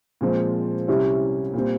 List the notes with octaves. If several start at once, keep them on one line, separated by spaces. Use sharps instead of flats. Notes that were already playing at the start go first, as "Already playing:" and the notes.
A#2 F3 G#3 C4 F4
C2 C3 G3 C#4 E4
A#2 G3 C4